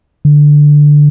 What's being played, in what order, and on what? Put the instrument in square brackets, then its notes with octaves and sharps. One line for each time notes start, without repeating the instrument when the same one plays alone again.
[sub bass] D3